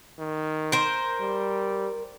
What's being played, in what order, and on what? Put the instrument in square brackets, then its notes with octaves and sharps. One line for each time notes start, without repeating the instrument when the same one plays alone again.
[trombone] D#3
[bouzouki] A#4 C5
[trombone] G3